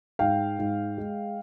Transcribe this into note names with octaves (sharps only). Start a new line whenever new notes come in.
G#2 F5 G5
G#2
G#3